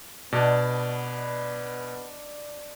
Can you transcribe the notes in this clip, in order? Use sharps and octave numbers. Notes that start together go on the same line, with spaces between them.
B2 B3 D4 D5 D#5